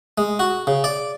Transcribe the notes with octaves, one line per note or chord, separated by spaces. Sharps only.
G#3
F#4
C#3
D5